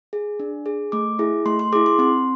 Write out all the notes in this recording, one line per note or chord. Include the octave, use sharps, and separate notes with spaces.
G#4
D4
G#4
A3 D6
E4 G#4
A3 C6
C6
E4 G#4 D6
C6
C4 C6